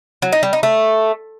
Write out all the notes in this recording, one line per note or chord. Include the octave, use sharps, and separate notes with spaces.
F#3
D#4
G3
D#4
A3